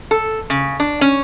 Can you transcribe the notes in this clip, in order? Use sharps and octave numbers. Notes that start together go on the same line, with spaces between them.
A4
C#3
D4
C#4